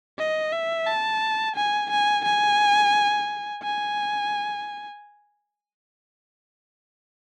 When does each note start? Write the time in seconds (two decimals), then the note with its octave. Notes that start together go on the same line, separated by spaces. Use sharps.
0.18 D#5
0.53 E5
0.87 A5
1.56 G#5
1.90 G#5
2.25 G#5
3.63 G#5